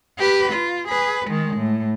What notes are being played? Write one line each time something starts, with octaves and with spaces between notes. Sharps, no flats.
G4 B4
F4
G#4 B4
D#3 G#3
A2